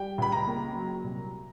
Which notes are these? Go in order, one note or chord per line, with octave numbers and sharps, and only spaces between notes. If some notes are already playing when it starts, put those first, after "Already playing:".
Already playing: G3 G5
C#2 B5
A#5
A#3
F#3
C2